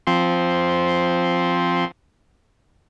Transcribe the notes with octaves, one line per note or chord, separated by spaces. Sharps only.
F3 C4 C6